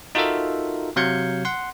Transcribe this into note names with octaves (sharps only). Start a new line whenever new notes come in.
D#4 F4 F#4 A4 A#4 E5
C3 F#3 F5 G6 G#6 C#7
F#5 C6